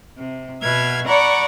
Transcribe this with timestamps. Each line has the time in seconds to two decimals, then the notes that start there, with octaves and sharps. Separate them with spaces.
0.17 C3
0.62 B2 B3 E5 F6 G#6
1.07 D5 F#5 A#5 B5 C#6